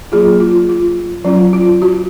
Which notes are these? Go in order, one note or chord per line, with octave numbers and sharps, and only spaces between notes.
F#3 A#3 F4 G#4
F4
F4
F#3 C#4 F4
F4
F#4